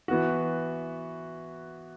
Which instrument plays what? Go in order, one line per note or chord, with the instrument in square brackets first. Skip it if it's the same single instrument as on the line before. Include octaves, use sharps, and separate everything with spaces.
[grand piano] E3 B3 F#4